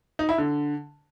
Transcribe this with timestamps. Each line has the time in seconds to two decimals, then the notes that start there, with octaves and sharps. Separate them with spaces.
0.19 D#4
0.29 E4
0.38 D3